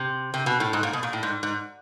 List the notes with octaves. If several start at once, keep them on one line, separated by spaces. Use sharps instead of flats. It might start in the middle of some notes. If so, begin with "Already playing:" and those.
Already playing: C3
C3
B2
A2
G#2
A#2
B2
A#2
A2
G#2
G#2